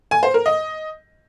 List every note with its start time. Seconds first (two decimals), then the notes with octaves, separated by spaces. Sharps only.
0.11 G#5
0.23 C5
0.34 A#4
0.46 D#5